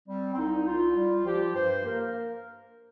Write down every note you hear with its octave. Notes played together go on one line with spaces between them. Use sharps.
G3 C4
C4
C2 D#4
C2 F4
G3
F3 G4
G2 C5
A#3 A#4